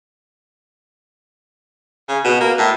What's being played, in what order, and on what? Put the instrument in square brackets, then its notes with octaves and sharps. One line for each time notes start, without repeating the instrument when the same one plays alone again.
[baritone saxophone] C#3
B2
A#3
A2